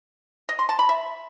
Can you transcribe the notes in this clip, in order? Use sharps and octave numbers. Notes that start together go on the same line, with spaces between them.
D#5
C6
A5
B5
E5